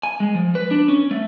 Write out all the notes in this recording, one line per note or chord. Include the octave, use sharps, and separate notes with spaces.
G#5
G#3
F3
B4
D4
C#4
A3